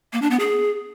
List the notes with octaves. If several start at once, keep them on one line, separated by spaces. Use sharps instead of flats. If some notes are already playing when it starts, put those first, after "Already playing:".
A#3
D4
B3
G#4